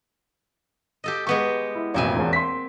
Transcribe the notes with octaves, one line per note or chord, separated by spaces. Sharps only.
G4 A4 D#5
G#3 B3 G4 C#6
E4
A1 F2 B2 A#3 C4 G#5
E1 E2
C6 B6